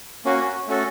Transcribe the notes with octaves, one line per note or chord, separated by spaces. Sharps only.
A#3 C#4 F#4
A3 C#4 F#4 A4